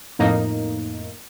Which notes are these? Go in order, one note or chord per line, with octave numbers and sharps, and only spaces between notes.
F2 A2 A#3 D#4